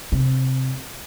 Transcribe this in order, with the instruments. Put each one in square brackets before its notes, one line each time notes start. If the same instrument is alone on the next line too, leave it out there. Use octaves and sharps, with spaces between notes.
[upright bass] C3